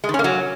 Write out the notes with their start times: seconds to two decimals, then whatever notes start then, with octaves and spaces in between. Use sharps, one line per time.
0.04 G#3
0.09 D#3
0.14 C#4
0.19 A#3
0.24 F#3